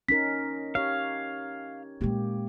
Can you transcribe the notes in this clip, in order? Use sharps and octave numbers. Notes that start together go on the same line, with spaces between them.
C#4 D#4 A#4 B6
G4 C#5 F5
A#2 G#3 A#3 G4